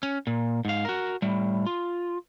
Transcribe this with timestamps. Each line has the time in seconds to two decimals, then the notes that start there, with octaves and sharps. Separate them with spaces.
0.03 C#4
0.27 A#2
0.65 G#2 F5
0.85 F#4 A#4
1.22 A2 G3
1.66 F4